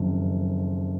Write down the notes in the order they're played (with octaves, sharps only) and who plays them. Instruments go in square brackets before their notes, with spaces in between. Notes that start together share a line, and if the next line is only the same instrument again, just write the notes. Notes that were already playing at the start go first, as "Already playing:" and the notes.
Already playing: [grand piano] F#1 F2 D#3